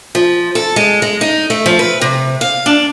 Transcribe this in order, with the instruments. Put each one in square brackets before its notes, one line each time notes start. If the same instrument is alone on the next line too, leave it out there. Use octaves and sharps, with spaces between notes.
[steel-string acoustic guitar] F3
A4
G#3
G#3
D#4
A3
F3
B4
C3
F5
D4